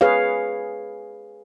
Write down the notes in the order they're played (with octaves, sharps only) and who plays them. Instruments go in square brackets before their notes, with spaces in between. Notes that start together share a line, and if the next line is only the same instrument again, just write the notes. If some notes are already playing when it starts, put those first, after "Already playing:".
[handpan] G#4 B4 C#5 F5